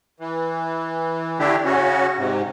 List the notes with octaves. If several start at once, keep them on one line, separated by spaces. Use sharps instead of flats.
E3
D3 A3 D4 E4 G4
C#3 C#4 F#4
G#2 C3